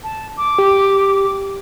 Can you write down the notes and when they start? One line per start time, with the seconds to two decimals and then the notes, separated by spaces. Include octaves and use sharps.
0.04 A5
0.38 D6
0.59 G4